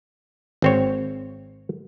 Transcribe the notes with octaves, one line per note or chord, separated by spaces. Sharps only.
G#1 C4 C#5